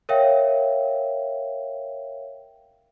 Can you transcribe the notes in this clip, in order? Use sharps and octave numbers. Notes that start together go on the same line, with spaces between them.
A#4 C#5 E5 F5 G5